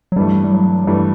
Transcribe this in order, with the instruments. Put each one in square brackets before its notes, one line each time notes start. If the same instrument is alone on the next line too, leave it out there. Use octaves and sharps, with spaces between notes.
[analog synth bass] F#3
[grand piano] G2 E3 A3 [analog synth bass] G3
[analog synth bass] G3
F#3
[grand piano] G2 E3 A3 [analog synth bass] G3